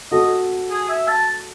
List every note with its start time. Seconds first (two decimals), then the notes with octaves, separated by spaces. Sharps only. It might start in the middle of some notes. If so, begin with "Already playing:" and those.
0.12 F#4 A4 D#5
0.70 G#4
0.89 E5
1.08 A5